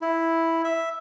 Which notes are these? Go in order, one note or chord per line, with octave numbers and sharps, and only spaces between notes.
E4
E5